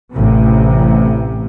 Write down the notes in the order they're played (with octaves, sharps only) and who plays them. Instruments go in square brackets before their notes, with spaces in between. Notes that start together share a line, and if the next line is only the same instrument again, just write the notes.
[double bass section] A1 C3